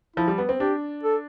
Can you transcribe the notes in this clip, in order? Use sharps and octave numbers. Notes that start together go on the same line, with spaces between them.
F3 E4
G3
B3
C4
D4 G4
A4